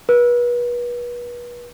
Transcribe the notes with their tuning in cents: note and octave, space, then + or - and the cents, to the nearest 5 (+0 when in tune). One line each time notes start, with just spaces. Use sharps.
B4 -35